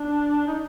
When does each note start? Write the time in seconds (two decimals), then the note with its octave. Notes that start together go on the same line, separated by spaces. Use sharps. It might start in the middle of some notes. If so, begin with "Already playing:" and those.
Already playing: D4
0.47 D#4